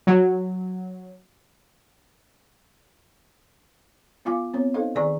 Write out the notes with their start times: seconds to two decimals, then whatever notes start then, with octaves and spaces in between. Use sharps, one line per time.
0.07 F#3
4.25 B3 F4 F5 G#5 D6
4.54 B3 C4 C#5
4.74 D#4 A4 C5 D#5 F5
4.95 D#3 G#4 D5 G#5 A#5 C#6